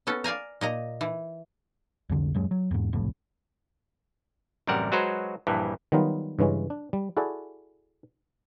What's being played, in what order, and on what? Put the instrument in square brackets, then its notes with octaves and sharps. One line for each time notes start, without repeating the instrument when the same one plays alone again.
[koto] B3 C#4 A4
D5 F5 G#5 A#5
A#2 D#5 A#5
E3
[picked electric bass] C2 F2 D3
D#1 F#2 F#3 G#3
F#3
E2 G#2
F#1 C2 F2 A2
[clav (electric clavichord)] A1 F#2 C3 G3 A#4 F#5
F#3 G#3 F#4 B4 C5 A#5
A#1 G2 E3
D#3 F#3 G3 B3 D#4 F4
G2 C#3 E3 G#3 C#4
D4
G3
E4 F#4 G#4 A4 D5